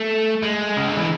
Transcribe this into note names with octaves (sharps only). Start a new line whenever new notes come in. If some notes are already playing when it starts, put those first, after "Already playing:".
Already playing: A3
G#3
C#3
D3
E3